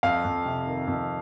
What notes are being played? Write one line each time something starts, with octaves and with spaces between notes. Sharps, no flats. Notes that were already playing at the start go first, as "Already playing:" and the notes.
F2 F5
F2
C3
D#3
F2